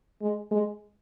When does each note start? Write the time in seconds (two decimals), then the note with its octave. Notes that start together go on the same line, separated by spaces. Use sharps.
0.22 G#3
0.51 G#3